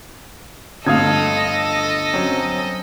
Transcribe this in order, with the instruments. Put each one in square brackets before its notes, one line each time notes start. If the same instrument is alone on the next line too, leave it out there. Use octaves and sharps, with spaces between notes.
[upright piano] G1 A3 [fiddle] A4 D#5 [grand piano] F5 D#6 G#6
[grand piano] F#3 C4 C#4